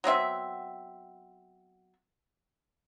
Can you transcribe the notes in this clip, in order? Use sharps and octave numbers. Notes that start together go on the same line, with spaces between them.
F#3 B3 C4 E5